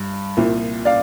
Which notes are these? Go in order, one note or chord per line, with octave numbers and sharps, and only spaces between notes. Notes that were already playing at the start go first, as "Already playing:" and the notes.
Already playing: G2
C2 A#2 F3
D5 F5